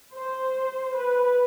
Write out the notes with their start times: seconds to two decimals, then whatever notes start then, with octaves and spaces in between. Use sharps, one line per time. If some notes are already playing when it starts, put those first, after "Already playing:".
0.14 C5
0.97 B4